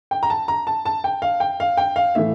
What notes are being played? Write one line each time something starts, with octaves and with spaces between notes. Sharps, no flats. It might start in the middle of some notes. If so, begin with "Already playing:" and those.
G5
A#5
A5
A#5
A5
A5
G5
F5
G5
F5
G5
F5
A2 E3 A3 E5